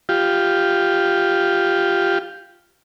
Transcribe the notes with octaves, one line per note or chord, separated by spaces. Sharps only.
F4 G4